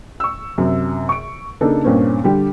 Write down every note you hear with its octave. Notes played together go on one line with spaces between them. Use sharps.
C#6 E6
F#2 C3
C#6 D7
C#3 A#3 D4 D#4 A4
G2 A#2 A#3 C4 C#4
D3 G3 G4